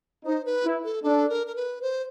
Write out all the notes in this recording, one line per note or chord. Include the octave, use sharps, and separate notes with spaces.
D#4 C5
B4
E4
A4
D4 A4
A#4
A#4
B4
C5